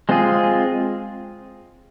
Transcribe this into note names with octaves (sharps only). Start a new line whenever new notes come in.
G#3 C4 F4 G#4